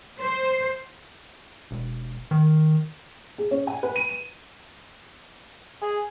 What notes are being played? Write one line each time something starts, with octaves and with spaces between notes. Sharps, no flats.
C5
E1
D#3
G#4
C#4
G#5
B4
D#7
E7
G#4